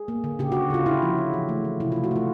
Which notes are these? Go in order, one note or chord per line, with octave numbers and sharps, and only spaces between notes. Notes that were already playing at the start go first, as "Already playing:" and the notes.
Already playing: G#4
A#3
D3
C#3 G4
C#3 F#4
C#3 F4
C#3 E4
F3
F3
E3
A3
E3
C3 E4
A3 F4
F#4
A3 F4